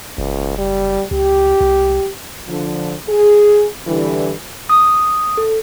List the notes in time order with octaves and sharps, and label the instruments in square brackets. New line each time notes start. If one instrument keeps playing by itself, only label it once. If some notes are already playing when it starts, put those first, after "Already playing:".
[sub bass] F#1 [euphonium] C#2
[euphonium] G3
[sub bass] C#2 [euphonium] G4
[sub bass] C2
[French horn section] D3 F3
G#4
D3 E3 G3
[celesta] D#6
A4